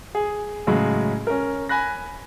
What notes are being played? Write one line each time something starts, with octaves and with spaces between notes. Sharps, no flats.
G#4
A2 C#3 F#3 G#3
C#4 A#4
G#5 B5 F#6 A#6